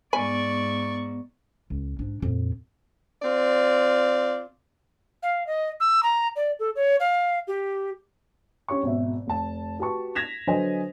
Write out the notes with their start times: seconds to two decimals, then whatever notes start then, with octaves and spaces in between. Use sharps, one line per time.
0.13 G#2 B3 D5 G#5 B5 C#6
1.70 C#2
1.99 G#2 D4
2.22 F2 A#2
3.22 C4 F4 D5
5.23 F5
5.47 D#5
5.80 E6
6.03 A#5
6.36 D5
6.60 A4
6.76 C#5
7.00 F5
7.48 G4
8.69 C#4 G4 C#5 C#6
8.83 G#1 B2 E5
9.27 F1 A5
9.79 F#4 G4 B4 A5 C#6
10.15 G#6 A#6 B6 E7 F7
10.47 D3 F#3 B4 C5 D#5 G#5